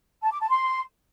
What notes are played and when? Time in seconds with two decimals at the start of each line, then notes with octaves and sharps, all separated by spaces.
0.22 A5
0.32 D6
0.41 A5
0.50 C6